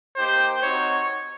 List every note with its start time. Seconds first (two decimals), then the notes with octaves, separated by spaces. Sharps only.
0.17 A#3 D#4 G4 C5
0.63 C4 D#4 F#4 C#5